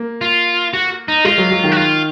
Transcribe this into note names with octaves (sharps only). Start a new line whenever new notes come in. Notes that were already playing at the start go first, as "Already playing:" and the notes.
Already playing: A#3
F4
F#4
D#4
G#3 F4
F#3
F#3
D#3
F#4
F4